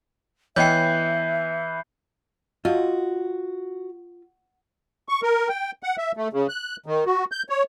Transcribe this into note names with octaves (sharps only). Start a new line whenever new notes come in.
E3 B3 C#5 D#5 E5 G5 G6 C7
F4 F#4 D#5
C#6
A#4
G5
F#5
E5
A3
C#3
F#6
D#3
F#4
G6
C#5